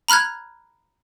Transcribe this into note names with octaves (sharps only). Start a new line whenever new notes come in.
A#5 B5 F6 F#6 G#6